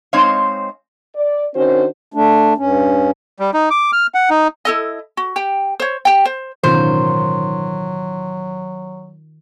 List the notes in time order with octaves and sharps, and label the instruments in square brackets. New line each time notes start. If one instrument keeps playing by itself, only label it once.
[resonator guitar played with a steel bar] G#3 C4 D#4 C5 C#5 F5
[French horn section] D5
D#3 C#4 D4 F#4 C5
[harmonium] A3 D4
G2 C#4
[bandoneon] G3
D#4
D6
F6
F#5
D#4
[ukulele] E4 A4 D#5
F#4
G4 G5
C5 C#5
G4 G5
C5
[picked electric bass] A1 B2 C#4 [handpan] D#3 F4 A#4 [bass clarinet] F#3 [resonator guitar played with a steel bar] C5